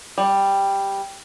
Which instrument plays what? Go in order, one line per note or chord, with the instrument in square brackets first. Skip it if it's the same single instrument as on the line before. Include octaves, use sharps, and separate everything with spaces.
[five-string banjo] G3